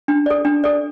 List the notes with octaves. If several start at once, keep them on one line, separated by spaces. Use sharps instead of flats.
D4
A4 D5
D4
A4 D5